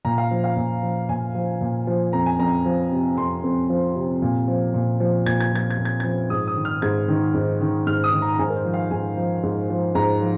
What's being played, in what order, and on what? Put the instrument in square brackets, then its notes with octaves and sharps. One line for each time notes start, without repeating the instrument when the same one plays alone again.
[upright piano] A#2 A#5
F5
F3
F5
A#2
F3
A#2 G#5
F3
A#2
F3
F2 A#5
G#5
F2 A#5
F3
C3
F2 C6
F2
F3
C3
A#2
F3
A#2
F3
A#2 G#6
G#6
F3 G#6
G#6
A#2
G#6
F3 G#6
G#2 D#6
D#6
D#3
F6
G#2 G#6
D#3
G#2
D#3
G#2 F6
D#6
D#3
A#5
A#5
G#2 G#5
A#4
C5
F3
F5
G#2 G#5
F3
G#2
F3
G#2 A#5
F3